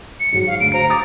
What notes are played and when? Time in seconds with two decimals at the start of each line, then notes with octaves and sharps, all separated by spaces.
0.20 C#7
0.32 G#2 F#3 F#4
0.47 F5
0.60 D2 D7
0.73 C5 A#5
0.90 D6 D#6 A6